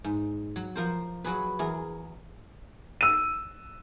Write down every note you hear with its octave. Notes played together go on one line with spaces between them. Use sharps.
G#2
F#3
F3 A#4 C5
F#3 F#4 G#4 B4
E2 G#4 A#4
E6 D#7